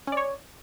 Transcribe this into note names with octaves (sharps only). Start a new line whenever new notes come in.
C#4 C#5 D5